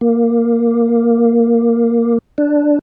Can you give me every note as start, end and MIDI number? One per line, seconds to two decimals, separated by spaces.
0.01 2.18 58
2.38 2.79 62